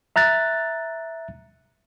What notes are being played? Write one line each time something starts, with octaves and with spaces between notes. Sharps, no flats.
E5 A#5 F#6 A6